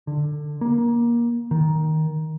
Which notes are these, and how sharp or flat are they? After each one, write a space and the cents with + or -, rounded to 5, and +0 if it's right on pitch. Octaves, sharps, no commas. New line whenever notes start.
D3 +20
A#3 +20
D#3 +10